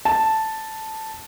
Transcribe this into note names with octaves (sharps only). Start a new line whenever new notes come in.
A5